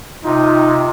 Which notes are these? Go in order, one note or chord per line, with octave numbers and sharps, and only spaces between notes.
C3 D#4 F4